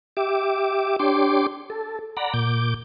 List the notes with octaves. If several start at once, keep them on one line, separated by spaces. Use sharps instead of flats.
G4 E5 D6
D4 G4 C#5 C6 D6
A4
D5 F#5 A#5 B5
A#2 D6 G6